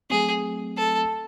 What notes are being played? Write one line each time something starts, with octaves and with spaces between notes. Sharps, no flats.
F#3 A3 C4 G#4
A4